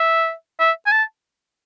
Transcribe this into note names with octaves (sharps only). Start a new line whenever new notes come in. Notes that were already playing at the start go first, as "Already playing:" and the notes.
Already playing: E5
E5
G#5
A5